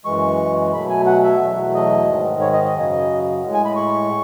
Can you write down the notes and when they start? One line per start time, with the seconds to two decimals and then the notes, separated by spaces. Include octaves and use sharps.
0.05 F#2 E3 G#3 C#6
0.73 B2 F#3 A3 B5
0.90 G#5
1.06 F#5
1.23 E5
1.40 E2 B2 F#3 A3
1.74 D#5
2.07 G#2 D#3 G#3
2.41 C#5
2.53 D#5
2.64 D#5
2.74 F#2 C#3 F#3
3.42 A2 G#3
3.54 G#5
3.65 B5
3.76 C#6